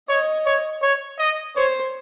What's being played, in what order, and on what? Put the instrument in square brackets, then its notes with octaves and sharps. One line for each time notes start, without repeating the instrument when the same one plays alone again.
[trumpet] C#5 [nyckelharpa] D#5
[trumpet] C#5
C#5
D#5
[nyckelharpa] C5 [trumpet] C#5